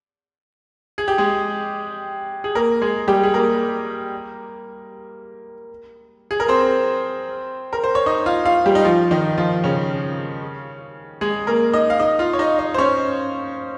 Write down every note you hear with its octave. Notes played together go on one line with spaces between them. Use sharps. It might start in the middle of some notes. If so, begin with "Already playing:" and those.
G#4
G4
G#3 G#4
G#4
A#3 A#4
G#3 G#4
G3 G4
G#4
A#3 A#4
G#4
A#4
C4 C5
A#4
C5
C#5
D#4 D#5
F4 F5
F4 F5
G3 G4
D#4
F3 F4
D#3 D#4
F3 F4
C#3 C#4
G#3 G#4
A#3 A#4
D#4 D#5
F5
D#4 D#5
F4 F5
C#5
D#4 D#5
D#4 D#5
C5
C#4 C#5